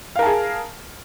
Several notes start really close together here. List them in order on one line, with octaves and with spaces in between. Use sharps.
F5 A#4 A5 G#4